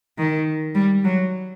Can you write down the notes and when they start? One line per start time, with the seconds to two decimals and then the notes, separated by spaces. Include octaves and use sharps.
0.18 D#3
0.75 G3
1.04 F#3